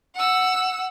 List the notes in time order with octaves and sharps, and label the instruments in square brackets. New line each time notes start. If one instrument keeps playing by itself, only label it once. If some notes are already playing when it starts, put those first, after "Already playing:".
[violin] F#5 E6